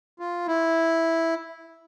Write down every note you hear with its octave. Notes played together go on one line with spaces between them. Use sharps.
F4
E4